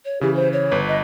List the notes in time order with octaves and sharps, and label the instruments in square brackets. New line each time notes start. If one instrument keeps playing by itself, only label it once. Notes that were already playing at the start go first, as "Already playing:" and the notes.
[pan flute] C#5
[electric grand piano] C#3 E3 [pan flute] G4
[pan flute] C5
C#5
[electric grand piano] G1 B4
[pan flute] D#5